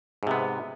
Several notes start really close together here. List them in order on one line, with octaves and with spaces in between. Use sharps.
G#2 C3 B3